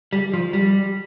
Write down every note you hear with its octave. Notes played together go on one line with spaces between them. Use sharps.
G3
F3
G3